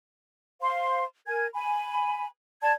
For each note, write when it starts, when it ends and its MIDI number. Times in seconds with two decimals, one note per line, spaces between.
0.61 1.04 72
0.61 1.04 77
0.61 1.04 84
1.26 1.46 70
1.26 1.46 80
1.26 1.46 92
1.54 2.25 80
1.54 2.25 83
2.62 2.72 74
2.62 2.72 81
2.62 2.72 92